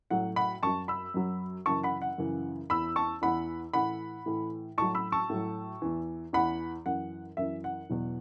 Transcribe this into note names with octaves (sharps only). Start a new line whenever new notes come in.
A2 F#3 F#5
F#5 B5
F#2 F#3 A5 C#6
B5 E6
F#2 F#3
F#2 C#3 E3 A5 C#6
F#5 B5
F#5
F#2 C#3 E3
E2 E3 B5 E6
A5 C#6
E2 E3 F#5 B5
A2 E3 F#5 B5
A2 E3
A2 F#3 A5 C#6
B5 E6
A5 C#6
A2 F#3
E2 E3
E2 E3 F#5 B5
F#2 E3 F#5
F#2 E3 E5
F#5
E2 B2 F#3